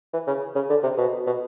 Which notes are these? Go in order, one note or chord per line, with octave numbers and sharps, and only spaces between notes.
E3
C#3
C#3
D3
C3
B2
B2